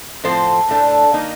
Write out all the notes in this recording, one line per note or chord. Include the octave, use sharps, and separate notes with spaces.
A2 F3 C4 A4 C5
A2 A3 D4
D#3 A#3 D#4